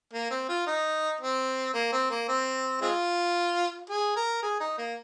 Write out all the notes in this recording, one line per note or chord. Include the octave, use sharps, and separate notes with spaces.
A#3
C4
F4
D#4
C4
A#3
C4
A#3
C4
G#3 C4 F4
G#4
A#4
G#4
D#4
A#3